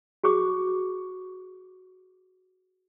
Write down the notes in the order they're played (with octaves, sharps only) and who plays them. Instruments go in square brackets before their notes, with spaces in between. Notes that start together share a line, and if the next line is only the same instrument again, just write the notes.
[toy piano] F#4 G#4 C#6 D6